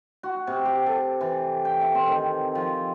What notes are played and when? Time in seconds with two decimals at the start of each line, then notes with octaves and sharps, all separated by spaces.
0.23 F#4
0.47 C3
0.65 G4
0.86 A4
1.21 E3
1.65 G5
1.81 E5
1.95 C4
2.08 D#3
2.55 F3